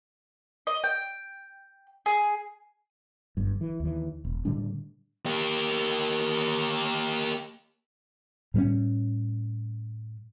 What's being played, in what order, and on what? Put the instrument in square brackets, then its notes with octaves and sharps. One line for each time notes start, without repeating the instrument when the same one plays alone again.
[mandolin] D#5
G5
G#4
[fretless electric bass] G1 G2
E3
D#2 E3
E1
A2 D3 G3 D4
[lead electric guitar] A#3 G4
[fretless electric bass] A2 G3 B3 C#4